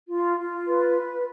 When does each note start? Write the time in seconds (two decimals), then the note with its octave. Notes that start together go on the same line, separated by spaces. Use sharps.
0.09 F4
0.38 F4
0.66 B4